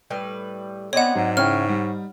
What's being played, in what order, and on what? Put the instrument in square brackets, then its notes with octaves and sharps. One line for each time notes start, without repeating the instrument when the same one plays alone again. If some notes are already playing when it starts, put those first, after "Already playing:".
[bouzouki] A2 G3 B4
[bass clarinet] B3 [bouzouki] C4 D4 D#5 [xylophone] C#5 F#5
[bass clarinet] G#2 [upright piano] F#3
[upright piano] C#3 C#4 E4 [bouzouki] C#5 G5 [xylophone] F6
[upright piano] G3 D#4